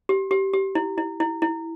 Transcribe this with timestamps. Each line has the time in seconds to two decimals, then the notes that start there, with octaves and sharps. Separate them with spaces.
0.09 G4
0.31 G4
0.53 G4
0.75 E4
0.98 E4
1.20 E4
1.42 E4